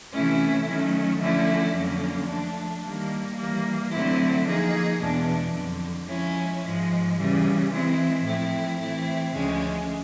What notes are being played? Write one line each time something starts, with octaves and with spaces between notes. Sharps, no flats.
C3 E3 A3 C#4 E4
D#3 F#3 A3 C#4
D3 F3 A3 C#4 E4
F2 D3 F#3 A#3 C#4
F3 A3 D4
D#3 G3 A#3
E3 G3 A#3
D3 F#3 A3 C4 E4
F3 A#3 D#4 G#4
E2 B2 G#3 B3 D4
F2 D3 F#3
F3 G#3 C#4 E4
G#2 F3 G#3
C#3 E3 G3
E3 G#3 C4 E4
A2 F3 A3 C4 E4
E3 A3 C4 E4
D2 C#3 F3 G#3 C#4